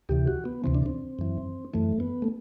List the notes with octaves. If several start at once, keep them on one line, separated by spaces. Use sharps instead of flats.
D2 C3 E3 G4
F#4
B3
D2 C3 E3 C4
D4
C4
F#2 E3
F#2 E3 A3
B3
A3